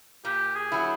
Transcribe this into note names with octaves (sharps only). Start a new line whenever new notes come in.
A#2 G4
G#4
F#3 B3 E4